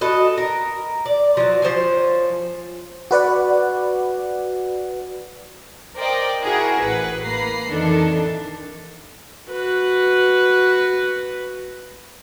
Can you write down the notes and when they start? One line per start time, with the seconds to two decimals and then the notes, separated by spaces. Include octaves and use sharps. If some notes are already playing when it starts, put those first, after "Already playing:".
0.01 F#4 A4 B4 D#5
0.37 A#4
1.06 D5
1.37 F3 F#3
1.62 F3 C5 C#5 G#5
3.11 F#4 B4 D5 F#5
5.96 A#4 C5 D5 D#5 G5
6.42 E4 F#4 G#4 A#4 E5 F#5
6.82 A1 B4 F#5
7.23 A#3 A#5 B5 C7
7.69 F2 D#3 E3 D4 A4
9.51 F#4 B4